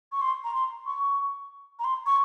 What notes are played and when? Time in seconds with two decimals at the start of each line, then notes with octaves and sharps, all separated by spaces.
0.12 C#6
0.21 C6
0.44 A#5
0.55 C6
0.86 C#6
1.79 A#5
1.84 C6
2.06 C#6